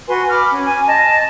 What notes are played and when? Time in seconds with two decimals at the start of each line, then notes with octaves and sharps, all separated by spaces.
0.08 F#4 B4 G#5 C6
0.29 B5 D6 F6
0.51 C#4
0.67 G#5
0.87 D#5 A5